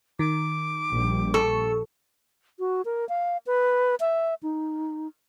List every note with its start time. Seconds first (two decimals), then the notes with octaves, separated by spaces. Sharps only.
0.19 D#3 D6
0.90 A#1 G3
1.34 A4 C#6
2.59 F#4
2.85 A#4
3.09 F5
3.47 B4
4.00 E5
4.43 D#4